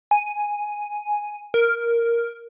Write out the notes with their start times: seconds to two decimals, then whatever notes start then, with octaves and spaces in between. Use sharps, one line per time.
0.11 G#5
1.54 A#4